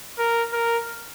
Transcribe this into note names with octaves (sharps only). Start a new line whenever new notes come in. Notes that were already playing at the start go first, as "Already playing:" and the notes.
A#4
A#4